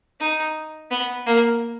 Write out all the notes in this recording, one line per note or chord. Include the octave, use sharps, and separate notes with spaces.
D#4
B3
A#3